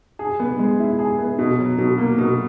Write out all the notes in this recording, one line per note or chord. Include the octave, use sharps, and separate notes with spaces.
G#4
B3
G#3
E4
G#4
B3
B2
F#3
B2
A#3
B2